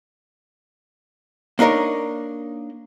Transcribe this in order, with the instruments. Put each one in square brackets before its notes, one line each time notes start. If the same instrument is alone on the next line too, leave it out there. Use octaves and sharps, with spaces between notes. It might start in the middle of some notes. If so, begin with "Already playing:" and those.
[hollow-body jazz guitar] A#3 D4 D#4 A#4 C#5